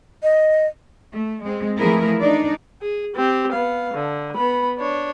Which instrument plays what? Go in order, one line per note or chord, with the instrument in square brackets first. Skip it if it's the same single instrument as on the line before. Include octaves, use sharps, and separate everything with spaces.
[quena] D#5
[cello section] A3
G#3 C4
E3 F3 A3 E4 G#4 A#4
D4 D#4 D5
[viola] G#4
C4 G4
B3 F5
D3
B3 B5
D4 C#5